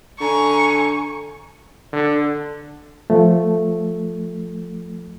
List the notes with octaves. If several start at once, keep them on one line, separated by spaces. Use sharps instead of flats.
D3 G#5 A#5 C#6
D3
F3 A3